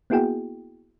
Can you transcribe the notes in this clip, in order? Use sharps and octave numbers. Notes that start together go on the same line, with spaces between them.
A#3 B3 E4 F#4 G#4 G5